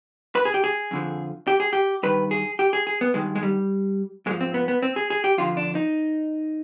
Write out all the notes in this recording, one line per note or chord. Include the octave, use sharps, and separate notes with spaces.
B4
G#4
G4
G#4
F2 D3 F3
G4
G#4
G4
G2 D#3 B4
G#4
G4
G#4
G#4
B3
G2 D#3 G#3
G#3
G3
G#2 F3 G#3
C4
B3
B3
C4
G#4
G#4
G4
F2 D3 F3 F4
D4
D#4